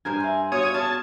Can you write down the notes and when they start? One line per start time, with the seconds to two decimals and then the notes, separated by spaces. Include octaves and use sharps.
0.05 G2 A#4 C5 G#5
0.21 E5 C6
0.52 B3 F4 F#4 C#5 D#6 G#6
0.74 C#4 G#4 A5 F6